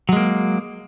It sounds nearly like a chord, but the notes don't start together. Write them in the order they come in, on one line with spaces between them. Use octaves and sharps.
F#3 G#3 A#3